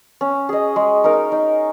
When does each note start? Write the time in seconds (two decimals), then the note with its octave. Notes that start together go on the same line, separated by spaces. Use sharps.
0.21 C#4
0.49 G#4 D#5
0.76 G#3
1.04 D#4 A#4
1.32 D#4